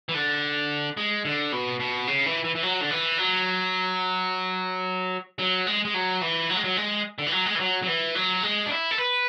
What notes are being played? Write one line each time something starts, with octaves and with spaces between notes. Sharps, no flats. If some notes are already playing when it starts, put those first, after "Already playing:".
E3
D3
G#3
D3
B2
B2
C#3
E3
E3
E3
F#3
D3
E3
F#3
F#3
G#3
G#3
F#3
E3
F#3
G#3
F#3
G#3
D3
E3
F#3
G#3
E3
F#3
F#3
E3
F#3
G#3
D4
E4
A4
B4